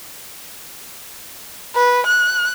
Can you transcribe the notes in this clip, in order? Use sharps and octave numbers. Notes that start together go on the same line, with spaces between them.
B4
F#6